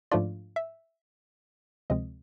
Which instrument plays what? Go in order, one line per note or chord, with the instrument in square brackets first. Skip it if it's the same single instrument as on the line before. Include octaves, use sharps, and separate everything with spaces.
[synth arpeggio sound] G#2 F3 A3 D4 F4 D5
E5
D2 C3 F3 G#3 C4 D#5